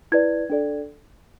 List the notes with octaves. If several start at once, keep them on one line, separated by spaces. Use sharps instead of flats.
E4 B4 D5 G#6
D4 A4 D5